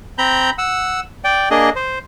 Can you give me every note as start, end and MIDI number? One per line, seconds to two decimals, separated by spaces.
0.18 0.50 60
0.18 0.50 82
0.18 0.50 83
0.18 0.50 91
0.58 1.00 78
0.58 1.00 88
1.24 1.49 74
1.24 1.49 79
1.51 1.70 58
1.51 1.70 62
1.51 1.70 68
1.51 1.70 75
1.76 1.99 72